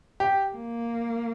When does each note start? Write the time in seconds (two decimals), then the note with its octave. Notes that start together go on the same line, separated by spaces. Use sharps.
0.20 G4
0.56 A#3